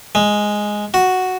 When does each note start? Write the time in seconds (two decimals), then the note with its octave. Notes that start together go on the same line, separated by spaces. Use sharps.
0.15 G#3
0.94 F#4